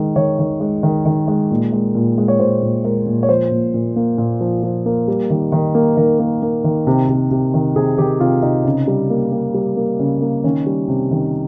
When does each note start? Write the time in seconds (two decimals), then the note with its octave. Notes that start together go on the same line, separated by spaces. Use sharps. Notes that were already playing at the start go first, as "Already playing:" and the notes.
Already playing: D#3 G#3
0.16 D#3 C#5
0.39 D#3
0.60 G#3
0.83 D#3
1.06 D#3
1.28 G#3
1.51 A#2
1.72 G#3
1.95 A#2
2.18 G#3
2.28 C#5
2.40 A#2 C5
2.63 A#2
2.84 G#3 A#4
3.06 A#2
3.23 C#5
3.29 F3 C5
3.51 A#2
3.74 A#2
3.96 A#3
4.18 A#2
4.41 F3
4.63 F3
4.86 A#3
5.08 G3
5.30 D#3
5.52 D#3
5.75 A#3
5.97 D#3 A#4
6.19 A#3
6.42 A#3
6.64 D#3
6.87 C3
7.09 C3
7.31 C3
7.54 D#3
7.76 C3 G#4
7.98 D#3 G4
8.20 C3 F4
8.43 C3 D#4
8.65 C#3
8.88 G3
9.10 A#3
9.32 A#3
9.54 G3
9.77 A#3
10.00 C#3
10.22 A#3
10.44 D#3 C#4
10.66 G3
10.88 C3
11.11 D#3